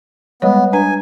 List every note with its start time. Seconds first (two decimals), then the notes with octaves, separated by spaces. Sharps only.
0.42 G3 G#3 B3 C#5
0.73 D4 B4 G#5 A#5